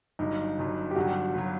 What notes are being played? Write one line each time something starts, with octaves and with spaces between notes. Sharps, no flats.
G1 G2 F#3 D#4
G1 G2 F#3
G4
G1 G2 F#3 F#4
G1 F#3